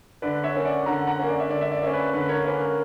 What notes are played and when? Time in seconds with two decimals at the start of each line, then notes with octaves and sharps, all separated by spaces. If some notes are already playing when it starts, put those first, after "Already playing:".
0.22 D3 B4 D5
0.43 C#5 E5
0.54 A#3 C#4
0.65 D5 F#5
0.86 D3 F#5 A#5
1.07 F#5 A#5
1.18 A#3 C#4
1.29 D5
1.40 E5
1.49 D3 D5
1.61 E5
1.72 D5
1.82 A#3 C#4 E5
1.93 B4 D5
2.13 D3 B4
2.29 A#4 C#5
2.45 A#3 C#4 B4
2.61 A#4